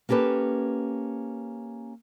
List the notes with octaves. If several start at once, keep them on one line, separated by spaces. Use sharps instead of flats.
A#3 C#4 G4 A4 B4